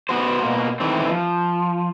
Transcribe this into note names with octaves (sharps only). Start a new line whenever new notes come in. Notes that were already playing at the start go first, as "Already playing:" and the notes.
B3 F#4 C5
B2 A#3
D#3 E3 A3 C4
F3